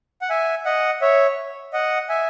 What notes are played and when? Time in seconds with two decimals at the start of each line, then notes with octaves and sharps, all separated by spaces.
0.22 F#5
0.30 E5 G#5
0.65 D#5 F#5
1.01 C#5 E5
1.73 D#5 F#5
2.09 E5 G#5